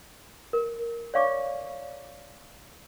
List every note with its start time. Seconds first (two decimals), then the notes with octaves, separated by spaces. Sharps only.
0.53 A#4
1.14 C#5 D5 F5 C#6 D6